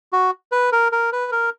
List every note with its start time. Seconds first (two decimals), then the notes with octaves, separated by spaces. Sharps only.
0.13 F#4
0.52 B4
0.72 A#4
0.92 A#4
1.12 B4
1.32 A#4